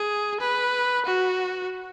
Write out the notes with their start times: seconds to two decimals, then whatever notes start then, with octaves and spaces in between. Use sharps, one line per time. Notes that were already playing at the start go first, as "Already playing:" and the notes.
Already playing: G#4
0.40 B4
1.06 F#4